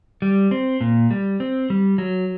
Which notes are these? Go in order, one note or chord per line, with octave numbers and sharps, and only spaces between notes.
G3
C4
A#2
G3
C4
G3
F#3